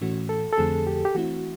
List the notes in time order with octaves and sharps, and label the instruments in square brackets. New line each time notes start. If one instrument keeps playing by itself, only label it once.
[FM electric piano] A2 E3 A3 C#4 F#4
[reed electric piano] A4
A4
[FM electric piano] F2 D3 F3 A3 C4 [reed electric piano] G#4
[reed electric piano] G4
G4
[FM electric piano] E3 A3 C4 E4 [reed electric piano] F#4